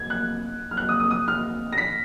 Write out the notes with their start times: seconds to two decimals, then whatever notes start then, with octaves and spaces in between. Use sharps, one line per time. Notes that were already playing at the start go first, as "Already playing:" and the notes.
Already playing: G#6
0.10 F#6
0.71 F6
0.77 F#6
0.89 D#6
1.00 D#6
1.11 D#6
1.28 F6
1.72 A#6
1.78 B6